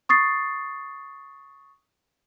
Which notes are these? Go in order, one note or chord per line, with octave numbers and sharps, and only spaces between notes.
C#6 D#6 A6 C7